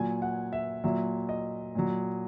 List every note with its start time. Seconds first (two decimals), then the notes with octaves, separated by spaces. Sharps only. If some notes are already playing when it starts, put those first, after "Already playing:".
Already playing: A#2 F#3 G#5
0.22 F#5
0.53 E5
0.84 A#2 F#3 E5
1.29 D#5
1.75 A#2 F#3